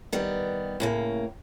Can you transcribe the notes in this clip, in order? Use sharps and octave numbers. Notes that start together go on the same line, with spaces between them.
D#3 G3 B3
A2 C#3 A#3